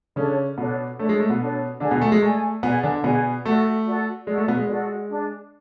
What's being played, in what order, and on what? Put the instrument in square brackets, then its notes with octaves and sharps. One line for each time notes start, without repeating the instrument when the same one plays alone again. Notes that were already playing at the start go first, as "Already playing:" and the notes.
[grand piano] C#3 C#4 [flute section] D4 A4 C#5
[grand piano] B2 B3 [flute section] D4 A4 C#5
[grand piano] A3 [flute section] D4 A4 C#5
[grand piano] G#3
A3
B2 B3
[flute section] D4 A4 C#5
[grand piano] D3 D4 [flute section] G#4 D5 G#5
[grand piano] B2 B3
A3
G#3
[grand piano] A3 [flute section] G#4 D5 G#5
[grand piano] B2 B3 [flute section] G#4 D5 G#5
[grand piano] D3 D4
[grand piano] B2 B3 [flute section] G#4 D5 G#5
[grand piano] A3 [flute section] F#4 A4 D5
[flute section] F#4 A4 D5
[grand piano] G#3 [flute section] F#4 A4 D5
[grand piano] A3
B2 B3
G#3
[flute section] F#4 A4 D5
D4 G#4 D5